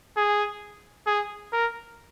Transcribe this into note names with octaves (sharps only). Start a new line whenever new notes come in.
G#4
G#4
A#4